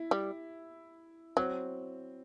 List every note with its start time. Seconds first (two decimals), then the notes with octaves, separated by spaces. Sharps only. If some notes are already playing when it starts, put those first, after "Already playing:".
Already playing: E4
0.11 G3
1.37 F#3 C4